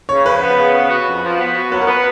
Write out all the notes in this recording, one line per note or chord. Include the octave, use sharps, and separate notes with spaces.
C#3 C#5
F3 B4
B3
C#3
B3
F#4
F2
F3
B3
F#4
F#3 B4
A#4
B3 B4